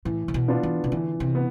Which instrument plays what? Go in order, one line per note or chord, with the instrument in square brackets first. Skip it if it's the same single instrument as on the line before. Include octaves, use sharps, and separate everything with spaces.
[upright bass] A2 [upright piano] E3
[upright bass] C3
B2
[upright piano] B3 D4 F4
[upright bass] E3
C3
[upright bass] D3 [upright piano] E3
[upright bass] C3
[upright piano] B3